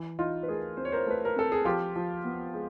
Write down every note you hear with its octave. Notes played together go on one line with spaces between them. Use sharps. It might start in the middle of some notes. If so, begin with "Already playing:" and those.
Already playing: E3
E3 D#4 F4
B4
A3 G#4 A#4
C4 C5
C#5
A#4 C5
A3 B4
A#4
C4 A4
G#4
F3 F4 G4
F3
B3
G#3